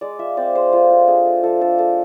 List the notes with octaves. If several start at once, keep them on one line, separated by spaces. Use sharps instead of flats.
G#3 D5
F4 E5
C4 D5
G#3 C5
A3 F4
F4
D4 G#4
A3
F3 A4
D4 A4
G#3 A4